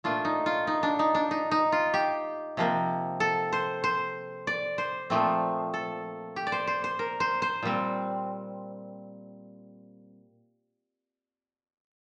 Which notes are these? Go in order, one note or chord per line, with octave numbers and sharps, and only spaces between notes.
A#2 A3 D4 F4
D#4
F4
D#4
D4
D#4
D4
D#4
D#4
F4
G4
C3 F3 A#3
A4
C5
C5
D5
C5
A#2 F3 A3 C4
A4
G4
D5
C5
C5
C5
A#4
C5
C5
A#2 G3 C4